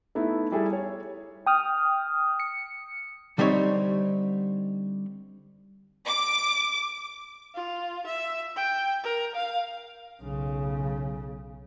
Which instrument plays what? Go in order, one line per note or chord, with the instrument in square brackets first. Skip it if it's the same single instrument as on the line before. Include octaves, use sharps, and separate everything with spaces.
[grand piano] A3 B3 D#4 E4
G3 E4 G#4 A4
C#5
[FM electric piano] G5 D#6 F6
C#7
[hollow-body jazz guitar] D3 G3 C4 D#4 C#5
[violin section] D6
[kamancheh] F4
E5
G5
A#4
F5
[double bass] B1 C#3